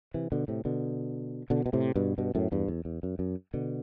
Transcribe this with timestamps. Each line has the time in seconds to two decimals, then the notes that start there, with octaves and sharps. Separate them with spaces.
0.14 C3 E3
0.32 B2 D3
0.48 A2 C3
0.65 B2 D3
1.50 B2 D3
1.66 B2
1.73 A2 C3
1.96 G2 B2
2.18 G2 B2
2.35 F#2 A2
2.52 E2 G2
2.68 E2
2.85 E2
3.03 F#2
3.19 F#2
3.54 B2 D3